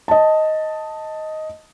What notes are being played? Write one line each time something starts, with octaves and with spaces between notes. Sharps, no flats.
D#5 A5